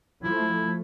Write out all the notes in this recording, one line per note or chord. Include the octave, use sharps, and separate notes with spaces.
F3 A3 E4